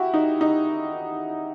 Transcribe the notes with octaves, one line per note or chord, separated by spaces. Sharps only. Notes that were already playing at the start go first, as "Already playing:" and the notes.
Already playing: E4 F#4 G4
D#4
D#4